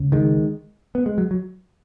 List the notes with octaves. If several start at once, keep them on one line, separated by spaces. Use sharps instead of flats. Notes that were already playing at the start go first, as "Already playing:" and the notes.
Already playing: C#2 C#3
D#3 G#3
B3
G#3
F#3
F#3